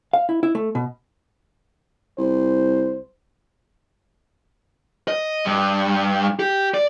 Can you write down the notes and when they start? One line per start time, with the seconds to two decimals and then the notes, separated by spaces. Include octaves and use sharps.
0.13 F5
0.29 E4
0.43 E4
0.55 A3
0.75 B2
2.18 C2 C5
5.08 D#5
5.45 G2
6.40 G4
6.74 D5